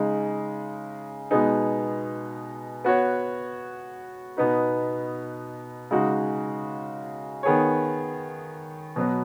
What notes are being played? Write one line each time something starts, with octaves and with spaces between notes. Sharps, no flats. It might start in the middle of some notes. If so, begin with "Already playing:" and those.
Already playing: C#3 G#3 D#4
B2 G#3 B3 D#4 G#4
B3 F#4 C#5
B2 B3 D#4 B4
C#3 G#3 D#4 F#4
D#3 B3 G#4 C#5
B2 F#3 B3